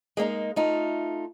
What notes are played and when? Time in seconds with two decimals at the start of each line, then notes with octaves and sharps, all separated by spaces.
0.17 G#3 A#3 C#4 D#4
0.56 A3 D#4 F4